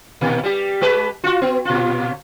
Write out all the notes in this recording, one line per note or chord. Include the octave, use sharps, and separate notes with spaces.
A#2 D#3
G3 G4
G#3 G4 B4
F4 F#4
B3
A#2 F4